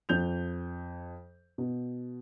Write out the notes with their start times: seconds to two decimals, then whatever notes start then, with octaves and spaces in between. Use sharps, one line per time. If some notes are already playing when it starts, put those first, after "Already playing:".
0.09 F2 G6 F7
1.58 B2